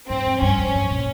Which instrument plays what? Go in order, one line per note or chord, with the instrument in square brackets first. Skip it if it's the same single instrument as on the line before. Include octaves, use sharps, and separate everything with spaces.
[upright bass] G#2 [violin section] C4
[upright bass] F2
[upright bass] G2 [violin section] C#4
[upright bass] F2
G2
A#2